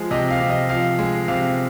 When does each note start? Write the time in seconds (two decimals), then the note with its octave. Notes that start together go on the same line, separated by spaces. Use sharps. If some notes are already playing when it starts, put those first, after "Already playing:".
Already playing: F3 G#3
0.11 C3 D#5
0.30 F5
0.40 C3
0.50 D#5
0.69 F3 F5
0.99 G#3
1.28 C3 F5